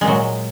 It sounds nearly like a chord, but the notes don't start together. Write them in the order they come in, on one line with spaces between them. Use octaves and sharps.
G#3 A#2 F#3